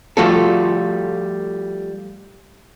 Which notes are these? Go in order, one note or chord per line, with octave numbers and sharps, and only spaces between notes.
F3 G3 A3 F4 F#4 A4